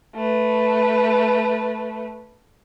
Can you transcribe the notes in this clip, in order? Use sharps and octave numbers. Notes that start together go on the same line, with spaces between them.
A3 B4